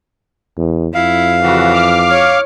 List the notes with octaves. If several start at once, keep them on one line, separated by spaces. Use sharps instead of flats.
E2
F2 E4 F5
C#3 E3 F#4
D6 F6
C#5